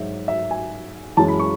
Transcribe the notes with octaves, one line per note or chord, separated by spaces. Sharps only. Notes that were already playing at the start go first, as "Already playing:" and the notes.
Already playing: G#2 F#3 E5
E5
G#5
F#2 E3 G#3 A5
B5
C#6